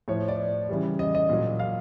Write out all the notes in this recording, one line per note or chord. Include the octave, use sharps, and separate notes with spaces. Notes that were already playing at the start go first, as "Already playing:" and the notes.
A2 F3 C#5
D5
C#3 E3 G3
D#5
D#5
A#2 F#3
F5